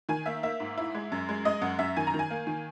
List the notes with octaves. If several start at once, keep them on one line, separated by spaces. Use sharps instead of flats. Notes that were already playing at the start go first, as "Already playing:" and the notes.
D#3 G#5
A#3 E5
A#3 E5
G#2
E4
G#3
F#2
G#3
G#3 D#5
F#2 F#5
F#2 E5
D#3 G#5
A#5
D#3
G#5
A#3
D#3